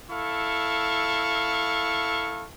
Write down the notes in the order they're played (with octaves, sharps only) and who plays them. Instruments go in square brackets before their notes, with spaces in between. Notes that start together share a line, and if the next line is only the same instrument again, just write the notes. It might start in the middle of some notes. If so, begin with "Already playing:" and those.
[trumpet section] E4 A4 F5 C#6